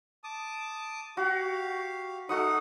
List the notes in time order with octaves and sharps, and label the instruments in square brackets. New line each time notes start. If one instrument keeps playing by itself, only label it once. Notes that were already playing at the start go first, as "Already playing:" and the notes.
[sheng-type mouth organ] A5 D6 D#6
[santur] F#4 [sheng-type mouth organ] G4 F5
[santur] A3 F#4 D#6 [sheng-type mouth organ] D#4 F#5